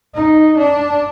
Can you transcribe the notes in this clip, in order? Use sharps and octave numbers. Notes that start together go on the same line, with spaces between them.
D#4
D4